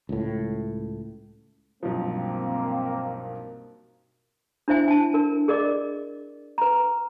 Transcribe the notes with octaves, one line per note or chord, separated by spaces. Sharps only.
C#2 A2
B1 G2 F3 A#3 C4
D4 E4 C5 E5 G#5
G#5 A5
D4 A#4
G#4 A#4 D5 D#5 D6
B4 A#5